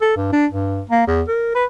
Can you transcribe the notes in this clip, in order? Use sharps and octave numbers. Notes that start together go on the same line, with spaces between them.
A4
G2
D4
G2
A#3
E2
A#4
B4